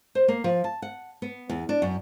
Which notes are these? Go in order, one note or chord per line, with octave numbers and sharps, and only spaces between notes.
C5
A#3
F3
A5
F#5
B3
E2
D4
F#2